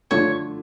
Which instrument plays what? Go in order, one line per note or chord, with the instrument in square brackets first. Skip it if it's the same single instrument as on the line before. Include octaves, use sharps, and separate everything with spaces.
[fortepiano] D3 A3 D4 F4 [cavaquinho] C#5